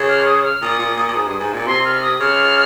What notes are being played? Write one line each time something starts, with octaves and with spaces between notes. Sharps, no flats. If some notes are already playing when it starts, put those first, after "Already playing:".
Already playing: C#3
F6
D#6
F6
A#2 D#6
A#2
A#2
A#2
G#2
G2
G#2
A#2
C3 C6
F6
D#6
C#3 F6